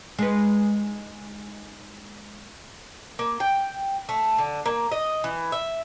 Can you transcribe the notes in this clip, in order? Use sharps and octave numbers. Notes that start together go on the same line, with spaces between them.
G#3 D#4 B4
A#3
G5
A3
D3
A#3
D#5
E3
E5